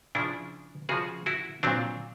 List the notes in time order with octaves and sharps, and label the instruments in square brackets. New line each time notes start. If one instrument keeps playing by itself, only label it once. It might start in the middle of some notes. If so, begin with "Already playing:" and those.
[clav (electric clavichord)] C#3 F3 D4 E4
C#3 F3 F#4 G#4
E4 F#4
A#2 F#3 C4 D4